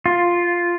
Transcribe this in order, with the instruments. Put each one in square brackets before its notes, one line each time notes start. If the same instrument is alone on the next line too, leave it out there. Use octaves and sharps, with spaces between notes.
[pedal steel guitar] F4